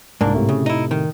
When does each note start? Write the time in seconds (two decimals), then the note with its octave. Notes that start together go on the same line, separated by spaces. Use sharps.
0.21 C2 G#2 A#3 D4
0.34 A2 C3 A3
0.49 C#3
0.66 D#4 E4
0.91 D#3